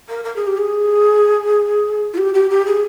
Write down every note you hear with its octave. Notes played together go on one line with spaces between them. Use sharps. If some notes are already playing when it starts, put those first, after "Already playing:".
A#4
A#4
G#4
G4
G#4
F4
G4
G4
G4
G#4